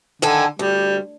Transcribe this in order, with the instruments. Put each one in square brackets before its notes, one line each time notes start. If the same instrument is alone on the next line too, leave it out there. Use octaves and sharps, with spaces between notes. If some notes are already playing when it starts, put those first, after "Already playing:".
[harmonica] D3 [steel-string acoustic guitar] D#3 A4 G#5
[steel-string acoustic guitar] D2 [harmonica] G3